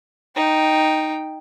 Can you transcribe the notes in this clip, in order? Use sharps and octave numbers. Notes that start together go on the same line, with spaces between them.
D#4 G5